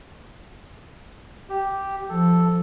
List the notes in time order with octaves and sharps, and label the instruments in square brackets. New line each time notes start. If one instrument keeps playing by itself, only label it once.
[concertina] G4
[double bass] F3 [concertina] A4